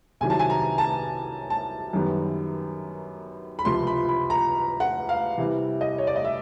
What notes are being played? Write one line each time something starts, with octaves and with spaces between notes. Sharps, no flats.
C2 C3 D#3 F#3 G#5
A5
G#5
A#5
A5
A5
F#2 D#3 G3 B3
B5
C#2 C3 F3 C6
B5
B5
A#5
F#5
F5
C3 E3 G3
D#5
C#5
D5
D#5
E5